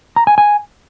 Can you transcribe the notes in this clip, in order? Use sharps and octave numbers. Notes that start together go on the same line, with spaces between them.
A#5
G#5
G#5